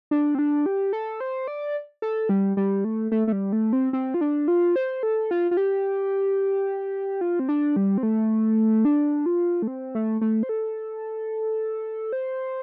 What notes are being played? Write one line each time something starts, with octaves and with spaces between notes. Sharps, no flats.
D4
C4
D4
G4
A4
C5
D5
A4
G3
G3
A3
A3
A3
G3
A3
C4
C4
F4
D4
F4
C5
A4
F4
F4
G4
F4
C4
D4
G3
C4
A3
D4
F4
A3
C4
A3
A3
C5
A4
C5